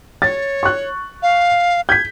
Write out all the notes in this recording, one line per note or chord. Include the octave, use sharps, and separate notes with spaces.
C#5 A6
C#6 F#6
F5
G6 G#6 B6